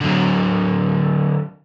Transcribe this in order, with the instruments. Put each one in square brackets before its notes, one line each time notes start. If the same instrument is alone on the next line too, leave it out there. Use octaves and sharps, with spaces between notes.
[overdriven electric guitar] D3 F#3